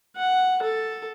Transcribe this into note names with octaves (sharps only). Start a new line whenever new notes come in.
F#5
A4